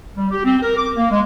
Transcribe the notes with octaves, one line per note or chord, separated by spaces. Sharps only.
G3
G4
C4
A#4
D6
A#3
G#3